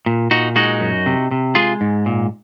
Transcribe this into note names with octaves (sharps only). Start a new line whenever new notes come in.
A#2
A#2 D#4 F#4
G#3 D#4 F#4
F#2
C3
C3
G#3 F4 G#4
G#2
A#2